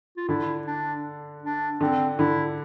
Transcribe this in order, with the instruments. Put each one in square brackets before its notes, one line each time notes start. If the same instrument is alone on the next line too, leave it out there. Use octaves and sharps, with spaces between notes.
[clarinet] F4
[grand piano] D3 [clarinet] E4
[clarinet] D4
D4
[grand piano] D3 [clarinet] C4
[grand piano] D3 [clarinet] E4